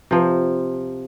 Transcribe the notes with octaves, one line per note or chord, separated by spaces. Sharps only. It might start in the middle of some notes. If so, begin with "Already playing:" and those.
C3 F3